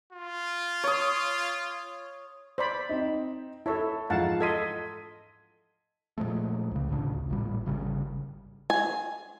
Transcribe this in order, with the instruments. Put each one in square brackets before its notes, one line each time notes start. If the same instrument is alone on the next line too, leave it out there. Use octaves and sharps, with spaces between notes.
[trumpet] F4
[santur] C#5 D#6
[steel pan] C5 D5 B5
[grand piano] C4 D#4
[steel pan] E4 C#5 E5 [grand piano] A4 A5
[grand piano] G#2 E3 F3 [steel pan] F5 F#5 A5
[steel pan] A4 D#5 C6 [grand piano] G#6 B6 D#7
[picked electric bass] A#2 F3 G#3 A3
C#2 C#3
A1 D2 C#3 D4
A1 A#2 G3
G#1 C#3 G3 C#4
[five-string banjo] G#5